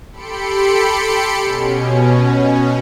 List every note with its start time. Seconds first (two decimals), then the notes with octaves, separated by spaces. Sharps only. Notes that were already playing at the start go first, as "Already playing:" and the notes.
0.12 G4 A4 B5 C6 C#7 D7
1.40 B2 C#4